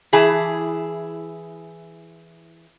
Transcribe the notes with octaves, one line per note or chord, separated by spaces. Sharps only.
E3 E4 G#4 A5